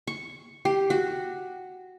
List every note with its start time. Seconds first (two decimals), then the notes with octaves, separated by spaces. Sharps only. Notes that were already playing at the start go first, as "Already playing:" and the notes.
0.07 C#6
0.65 G4
0.90 F#4